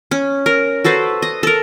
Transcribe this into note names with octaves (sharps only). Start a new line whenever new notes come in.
C#4
A#4
F#4 A4 B4 C5
D#5
A4 A#4